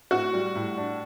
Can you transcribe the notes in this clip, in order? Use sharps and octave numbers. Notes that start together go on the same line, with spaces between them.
A2 F#4
G3
A2
D4